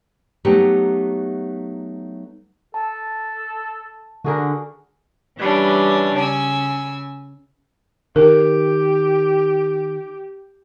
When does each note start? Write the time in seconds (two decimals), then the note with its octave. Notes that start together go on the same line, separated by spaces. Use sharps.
0.45 F#3 A3 B3 D#4 G4
2.74 A4 A5
4.24 D3 F#4 G#4 A#4
5.38 E3 G3 C#4 D4
6.17 C#3 G#5 E6
8.16 D#3 G4 A#4